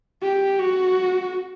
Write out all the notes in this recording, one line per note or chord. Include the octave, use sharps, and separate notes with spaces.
G4
F#4